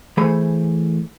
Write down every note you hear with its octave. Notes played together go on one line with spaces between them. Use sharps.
E3 A3 G#4 C5 B5